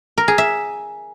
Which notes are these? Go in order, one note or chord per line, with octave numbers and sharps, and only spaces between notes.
A#4
G#4
E5